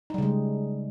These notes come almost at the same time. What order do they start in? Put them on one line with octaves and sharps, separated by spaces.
D#4 G3 C#3 G#3